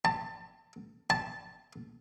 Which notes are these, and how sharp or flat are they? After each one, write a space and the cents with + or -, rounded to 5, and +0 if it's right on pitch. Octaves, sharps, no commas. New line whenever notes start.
A5 +25
A5 -5